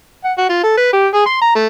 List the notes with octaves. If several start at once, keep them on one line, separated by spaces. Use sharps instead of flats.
F#5
F#4
F4
A4
B4
G4
G#4
C6
A#5
A3